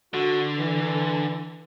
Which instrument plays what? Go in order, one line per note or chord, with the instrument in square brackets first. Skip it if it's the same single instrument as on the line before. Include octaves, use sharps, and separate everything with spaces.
[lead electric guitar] D3 [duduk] F#4
[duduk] E3